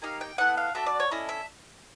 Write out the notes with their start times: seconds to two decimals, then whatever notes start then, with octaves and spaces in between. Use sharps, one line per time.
0.02 A#3 D#4 G4 F5
0.21 G5
0.38 B3 E4 A4 F#5
0.57 F5
0.75 D4 F#4 A4 E5
0.86 D5
1.00 C#5
1.11 C#4 E4 A4 D#5
1.29 E5